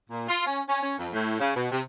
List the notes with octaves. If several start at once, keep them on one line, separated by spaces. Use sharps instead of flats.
A#2
F4
C#4
C#4
C#4
F2
A2
C#3
B2
C3